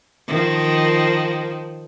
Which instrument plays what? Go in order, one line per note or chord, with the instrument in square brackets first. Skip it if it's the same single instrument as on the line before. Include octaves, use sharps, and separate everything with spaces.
[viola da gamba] D#3 F3